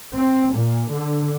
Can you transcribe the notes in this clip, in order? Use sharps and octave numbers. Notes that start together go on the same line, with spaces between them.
C4
A#2
D3